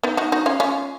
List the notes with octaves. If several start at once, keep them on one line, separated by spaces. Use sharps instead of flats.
B3 D#4
D#4 F#4
D#4 F#4
C#4 F4
C#4 F4